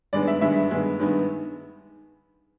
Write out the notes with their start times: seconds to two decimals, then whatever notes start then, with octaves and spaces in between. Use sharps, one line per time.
0.13 G2 D#3 G#3 B3 D5
0.27 E5
0.41 G2 D#3 G#3 B3 E5
0.70 G2 D#3 G#3 B3
0.99 G2 D#3 G#3 B3